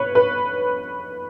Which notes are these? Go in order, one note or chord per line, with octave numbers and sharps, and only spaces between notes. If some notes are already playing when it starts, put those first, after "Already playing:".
Already playing: B4 C#5
B4